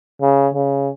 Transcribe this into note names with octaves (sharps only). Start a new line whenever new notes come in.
C#3
C#3